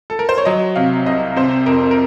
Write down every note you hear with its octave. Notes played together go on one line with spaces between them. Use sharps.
A4
A#4
C5
C#5
F#3 D#5
C3 F5
C2 D#5
C3 C5
F2 A#4
A#4